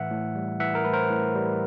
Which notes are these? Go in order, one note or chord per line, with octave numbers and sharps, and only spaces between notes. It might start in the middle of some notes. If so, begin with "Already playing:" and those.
Already playing: A2 E3 E5 F#5
A2
G3
E3 E5 F#5
A#4
A2 B4
A#4 C5
A2
G3